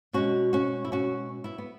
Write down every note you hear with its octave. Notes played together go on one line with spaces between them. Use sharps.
B2 G#3 C#4 F#4
C#4 F#4
E4
C#4 F#4
B3 E4
B3